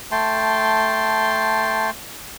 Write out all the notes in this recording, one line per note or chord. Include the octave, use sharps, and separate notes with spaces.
A3 G5 A5 C6